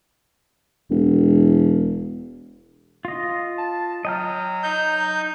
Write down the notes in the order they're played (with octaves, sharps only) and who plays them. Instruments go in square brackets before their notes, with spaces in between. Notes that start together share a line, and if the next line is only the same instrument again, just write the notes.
[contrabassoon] E1
[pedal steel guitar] F4 D#5
[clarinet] A5
[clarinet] F#3 [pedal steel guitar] D#5 G5 F6
[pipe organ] D#4 G6